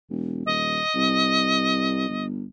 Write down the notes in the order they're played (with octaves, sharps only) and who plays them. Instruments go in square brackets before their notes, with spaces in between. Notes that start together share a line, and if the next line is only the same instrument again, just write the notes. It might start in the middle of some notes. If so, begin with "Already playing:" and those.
[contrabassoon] E1
[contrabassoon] D#1 [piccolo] D#5
[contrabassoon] C2
G1